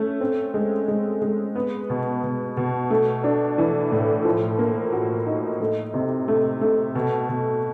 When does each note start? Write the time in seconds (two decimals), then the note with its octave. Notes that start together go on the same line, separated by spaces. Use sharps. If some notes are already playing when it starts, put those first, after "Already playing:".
Already playing: A3 C#4
0.20 C4
0.54 G#3
0.88 G#3
1.22 G#3
1.55 B3
1.90 B2
2.23 B2
2.57 B2
2.90 A3
3.24 D4
3.58 E3
3.92 A2
4.25 F3
4.59 A#3
4.93 F#4
5.26 D#4
5.60 A3
5.94 C3
6.28 A3
6.61 A3
6.95 B2
7.29 B2